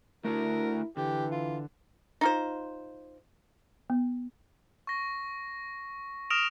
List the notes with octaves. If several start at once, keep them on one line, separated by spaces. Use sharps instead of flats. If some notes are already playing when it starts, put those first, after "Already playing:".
A3 D4 E4 F#4 A#4
D3 E3 G4
F4
D#4 F4 C5
B3
C#6 A#6
D#6 F6 A#6 D7 E7 F7